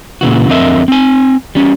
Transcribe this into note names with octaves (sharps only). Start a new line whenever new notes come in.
A#2 C#3 E3 F#4
F2 D3 C4 A#4 D#5 E5
C4 G#5
G3 C#4